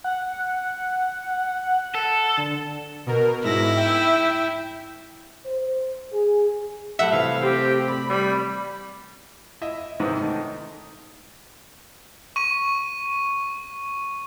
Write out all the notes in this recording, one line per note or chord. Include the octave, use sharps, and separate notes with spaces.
F#5
A4
D3
B2 A#4
G#2 E4 A#6
E5 G5
C5
G#4
G3 A3 E5 F#5 G5
C3 E3 F5
C4 G4
D5 B5
G3 B5
E4 D#5 E5
G#2 C3 D#3 E3
D#3 A3 D#4
C#6 D#7